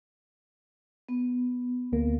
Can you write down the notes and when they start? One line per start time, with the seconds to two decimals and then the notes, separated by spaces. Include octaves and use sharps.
1.09 B3
1.92 D2 A#3